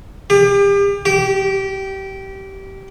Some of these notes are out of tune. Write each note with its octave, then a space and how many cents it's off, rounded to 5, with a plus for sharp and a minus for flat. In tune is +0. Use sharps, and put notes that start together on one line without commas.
G4 +35
G4 -20